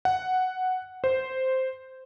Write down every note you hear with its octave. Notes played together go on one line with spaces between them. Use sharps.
F#5
C5